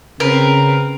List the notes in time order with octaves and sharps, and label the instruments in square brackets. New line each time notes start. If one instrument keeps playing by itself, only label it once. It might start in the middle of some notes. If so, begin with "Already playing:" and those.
[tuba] C#3 [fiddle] C4 B4 [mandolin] A#4